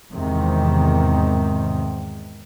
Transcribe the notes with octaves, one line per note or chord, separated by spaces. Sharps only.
E2 G#2 C3 D#3